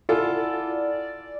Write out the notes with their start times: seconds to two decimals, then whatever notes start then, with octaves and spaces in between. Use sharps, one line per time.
0.09 E4 F4 A4 D5 F#5 G#5